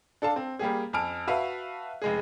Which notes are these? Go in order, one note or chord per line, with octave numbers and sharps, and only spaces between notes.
D4 A4 F5 A5
C4
G3 A#3 G4 G#4
F2 G#5 A5 F6 D7
F#4 B4 E5 F5 A5
F1 G#3 G#4